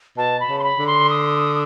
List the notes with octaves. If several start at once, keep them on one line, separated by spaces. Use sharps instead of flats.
B2 A5
B5
C#3
C6
B5
D3
C6
D#6